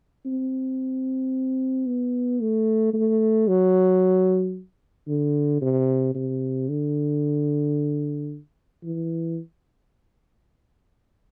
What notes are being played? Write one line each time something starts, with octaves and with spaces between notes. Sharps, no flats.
C4
B3
A3
A3
F#3
D3
C3
C3
D3
E3